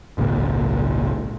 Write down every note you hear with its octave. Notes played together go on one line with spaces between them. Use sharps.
G#1 C#2 A#2